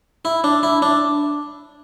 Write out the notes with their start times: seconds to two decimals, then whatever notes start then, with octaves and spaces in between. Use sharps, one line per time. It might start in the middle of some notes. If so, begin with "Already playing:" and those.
0.25 E4
0.44 D4
0.63 E4
0.82 D4